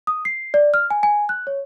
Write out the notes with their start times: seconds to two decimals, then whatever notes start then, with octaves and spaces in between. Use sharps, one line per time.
0.07 D#6
0.25 C7
0.54 D5
0.74 F6
0.90 G#5
1.03 G#5
1.29 F#6
1.47 C#5